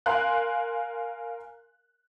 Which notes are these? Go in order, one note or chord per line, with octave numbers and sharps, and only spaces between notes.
A#4 F5 G#5 C6 F#6